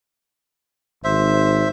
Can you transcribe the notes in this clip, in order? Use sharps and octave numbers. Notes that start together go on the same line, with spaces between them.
G#1 C5 E5